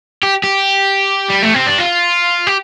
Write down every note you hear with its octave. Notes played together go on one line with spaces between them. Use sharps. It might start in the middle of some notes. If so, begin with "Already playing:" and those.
G4
G4
G3
A3
C4
D4
F4
G4